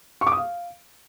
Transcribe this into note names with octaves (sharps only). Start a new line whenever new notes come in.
C#6
D6
D#6
F5